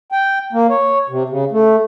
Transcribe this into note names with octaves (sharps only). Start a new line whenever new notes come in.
G5
A#3
C#5
C3
C#3
A3